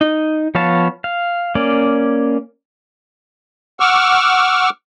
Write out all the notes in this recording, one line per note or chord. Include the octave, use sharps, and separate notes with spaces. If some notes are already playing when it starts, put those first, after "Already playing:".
D#4
F3 B3 C#5 F5 A5
F5
A#3 C#4 D5
F#5 C#6 D6 E6 F6